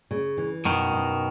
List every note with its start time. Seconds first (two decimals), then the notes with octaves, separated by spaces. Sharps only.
0.11 C#3
0.37 E3
0.64 F#2 B2 D#3
0.92 F#2